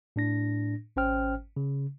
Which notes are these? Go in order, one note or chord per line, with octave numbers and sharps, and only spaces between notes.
A2 D4 A#6
G#1 C#4 C5 G5 F6
C#3